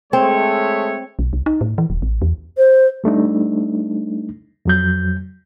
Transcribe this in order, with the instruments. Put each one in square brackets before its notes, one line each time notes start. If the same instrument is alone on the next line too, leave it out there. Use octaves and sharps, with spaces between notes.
[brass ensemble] G#3 A3 C#5 [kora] C4
[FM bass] B1
C2
D#4
A2
E3
D#1
A1
E2
[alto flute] C5
[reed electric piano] G3 A3 D4 D#4
F2 F#3 G6